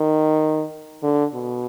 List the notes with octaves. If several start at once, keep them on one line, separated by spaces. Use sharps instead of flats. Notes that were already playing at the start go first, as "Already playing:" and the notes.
Already playing: D#3
D3
B2